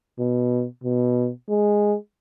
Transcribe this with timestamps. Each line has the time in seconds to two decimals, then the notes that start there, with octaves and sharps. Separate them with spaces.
0.19 B2
0.84 B2
1.49 G#3